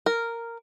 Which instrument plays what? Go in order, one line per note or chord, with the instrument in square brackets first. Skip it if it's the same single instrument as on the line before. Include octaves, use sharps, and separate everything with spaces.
[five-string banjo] A#4